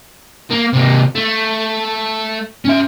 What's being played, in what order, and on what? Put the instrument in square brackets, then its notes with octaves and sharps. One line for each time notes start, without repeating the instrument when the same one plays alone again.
[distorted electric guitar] A#3
C3 A#3
A3
C#4 E5